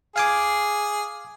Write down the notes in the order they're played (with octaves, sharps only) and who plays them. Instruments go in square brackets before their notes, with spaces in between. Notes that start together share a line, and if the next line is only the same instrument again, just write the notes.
[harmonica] G#4 [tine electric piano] F5 G#5 D6